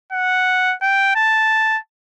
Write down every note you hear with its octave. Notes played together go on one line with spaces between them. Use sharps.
F#5
G5
A5